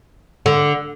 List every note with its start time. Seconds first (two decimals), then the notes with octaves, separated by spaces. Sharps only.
0.46 D3